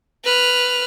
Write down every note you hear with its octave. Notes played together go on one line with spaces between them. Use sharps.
B4 F6